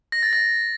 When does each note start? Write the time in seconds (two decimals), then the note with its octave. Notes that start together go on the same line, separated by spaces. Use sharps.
0.12 A#6
0.23 A6
0.33 A#6